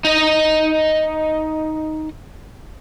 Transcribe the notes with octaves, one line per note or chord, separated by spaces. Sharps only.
D#4 D#5